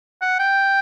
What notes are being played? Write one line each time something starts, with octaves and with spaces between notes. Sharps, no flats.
F#5
G5